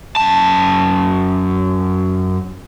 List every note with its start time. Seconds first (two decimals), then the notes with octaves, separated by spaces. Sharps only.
0.16 F#2 A5